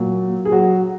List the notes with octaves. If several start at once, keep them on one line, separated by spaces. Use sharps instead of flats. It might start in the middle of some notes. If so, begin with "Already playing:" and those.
Already playing: A#2 F#3
G#4
F#3 F#4